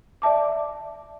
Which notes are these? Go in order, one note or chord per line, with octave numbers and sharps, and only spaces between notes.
D5 E5 A5 D6